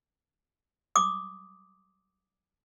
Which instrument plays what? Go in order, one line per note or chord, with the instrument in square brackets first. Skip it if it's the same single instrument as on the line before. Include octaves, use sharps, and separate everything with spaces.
[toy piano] D6 D#6